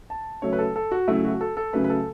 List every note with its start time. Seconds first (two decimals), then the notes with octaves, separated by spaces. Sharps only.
0.10 A5
0.42 C#3 F#3 A3 C#5
0.53 B4
0.59 A4
0.76 A4
0.92 F#4
1.08 C#3 F#3 A3 E4
1.24 F#4
1.41 A4
1.57 A4
1.73 C#3 F#3 A3 B4
1.84 B4
1.90 A4